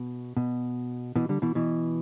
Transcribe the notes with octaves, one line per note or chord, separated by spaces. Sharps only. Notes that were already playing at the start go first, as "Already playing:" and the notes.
Already playing: B2
B2
B2 E3
D3 G3
B2 E3
B2 E3